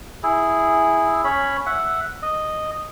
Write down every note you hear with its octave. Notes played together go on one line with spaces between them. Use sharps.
E4 G#4
C#4 C#5 B5
E5 F#5
D#5